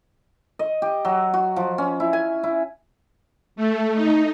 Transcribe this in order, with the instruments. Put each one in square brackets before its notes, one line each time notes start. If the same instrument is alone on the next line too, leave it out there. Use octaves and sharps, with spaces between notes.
[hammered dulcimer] D#5
G4
F#3
F#4
F3
C#4
E4
G#5
E4
[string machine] A3
D#4